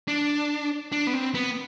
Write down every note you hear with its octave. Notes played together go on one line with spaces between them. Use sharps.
D4
D4
B3
C4
B3